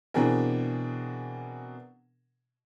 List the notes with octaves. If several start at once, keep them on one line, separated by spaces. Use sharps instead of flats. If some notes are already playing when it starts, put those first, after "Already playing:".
B2 E3 C4 D4 G#4 A#4